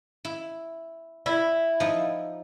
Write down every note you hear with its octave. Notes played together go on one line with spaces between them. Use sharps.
E4
E4 B5
F3 D#4